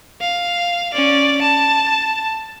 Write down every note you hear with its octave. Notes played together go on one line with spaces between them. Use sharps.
F5
C#4 D5
A5